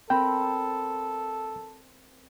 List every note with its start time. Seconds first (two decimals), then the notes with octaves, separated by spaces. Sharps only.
0.10 C4 A4 A#4 G5 B5